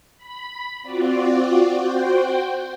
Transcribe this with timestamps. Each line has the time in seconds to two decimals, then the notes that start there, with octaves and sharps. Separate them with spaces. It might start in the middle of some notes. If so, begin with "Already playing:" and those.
0.17 B5
0.82 C4 F4 F#4 D5
1.72 F#4 C5 G5